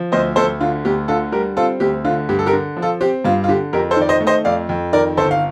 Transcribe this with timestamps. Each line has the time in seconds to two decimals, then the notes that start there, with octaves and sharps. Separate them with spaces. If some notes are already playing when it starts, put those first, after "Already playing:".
Already playing: F3
0.12 D2 C5 D#5
0.36 D2 A4 C5
0.61 D3 F4
0.85 D2 G4
1.08 D3 F4 A4
1.32 G3 G4 A#4
1.57 C4 F4 A4
1.80 D2 G4
2.05 D3 F4
2.29 G2 G4
2.39 A4
2.46 G4 A#4
2.53 D3
2.77 F3
2.82 F4 A4
3.01 C4 G4
3.25 G2 F4
3.44 F4
3.48 D3 G4
3.73 F2 G4 A#4
3.91 A4 C5
3.96 D#3 D5
4.09 C5 D#5
4.21 A3
4.27 C5 D#5
4.45 F2 D5 F5
4.69 F2
4.93 D#3 A#4 D5
5.17 G1 A4 C5
5.31 F5